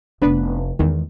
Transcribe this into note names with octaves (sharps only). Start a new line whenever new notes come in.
F1 B3 D4 B4
E2 D#3 G#3